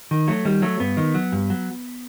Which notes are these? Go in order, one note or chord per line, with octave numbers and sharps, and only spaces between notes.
D#3
F#3 A3
D#3 G3
F#3 A3
G2 B3
D#3
F#3
G2
F#3